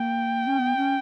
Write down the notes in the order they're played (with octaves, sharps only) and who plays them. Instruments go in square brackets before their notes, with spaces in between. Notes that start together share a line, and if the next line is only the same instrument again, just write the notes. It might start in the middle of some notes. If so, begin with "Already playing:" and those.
Already playing: [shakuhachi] A#3 [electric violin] G5
[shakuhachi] C#4
B3
C#4